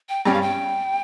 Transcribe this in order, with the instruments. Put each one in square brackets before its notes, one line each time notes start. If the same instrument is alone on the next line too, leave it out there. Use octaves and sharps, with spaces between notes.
[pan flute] G5
[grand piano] G2 G3 C#4 [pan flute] G5
[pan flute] F5
G5